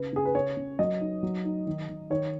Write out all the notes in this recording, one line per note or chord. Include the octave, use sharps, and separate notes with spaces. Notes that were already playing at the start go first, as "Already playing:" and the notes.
Already playing: C#3 B4
C#3 G#4
B4
C#3 C#5
C#3
F#3 D#5
D#4
F#3
D#4
D#3
D#3
D#3 C#5